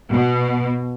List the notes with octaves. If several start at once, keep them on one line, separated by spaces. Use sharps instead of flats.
B2